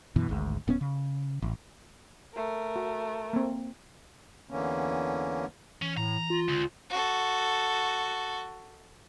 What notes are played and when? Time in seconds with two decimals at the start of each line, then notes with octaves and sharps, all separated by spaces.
0.16 F#2 B2 E3
0.29 G#1 D2 G#2
0.68 D1 B3 C#4
0.81 C#3
1.42 A1
2.35 A3 A#4
2.76 F#4
3.33 A#3 C4
4.50 E2 D3 E3 A#3 C#4
5.82 E3 C#4
5.97 A2 A#5
6.30 F4
6.48 C#2 D3
6.90 F#4 A4